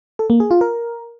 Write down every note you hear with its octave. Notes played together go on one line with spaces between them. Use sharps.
A4
A#3
G#4
F4
A#4